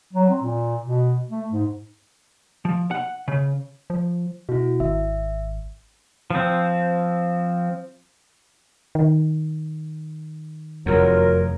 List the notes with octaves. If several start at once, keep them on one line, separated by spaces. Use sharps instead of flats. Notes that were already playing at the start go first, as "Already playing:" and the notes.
F#3
C4
A#2
B2
A3
G#2
F3
F#5
C#3
F3
B2 E4 F#4
G#1 E5
F3 C4
D#3
F1 E2 F#3 F4 A#4